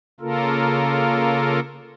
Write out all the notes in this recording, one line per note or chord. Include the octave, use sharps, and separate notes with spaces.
C#3 A#3 F4 A4 A#4